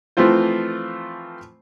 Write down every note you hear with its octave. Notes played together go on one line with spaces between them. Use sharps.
E3 F3 A3 C4 F4 C5